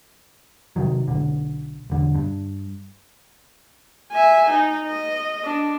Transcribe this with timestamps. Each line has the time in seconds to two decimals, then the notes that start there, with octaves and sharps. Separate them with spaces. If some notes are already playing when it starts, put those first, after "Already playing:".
0.76 C3 D#3 F#3
1.08 B1 D3
1.90 E1 D3
2.15 G2
4.12 E5 G#5
4.50 D#4
4.88 D#5
5.45 D4